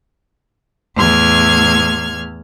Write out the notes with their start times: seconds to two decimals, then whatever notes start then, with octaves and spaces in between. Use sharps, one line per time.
0.96 E2 A2 F6 G#6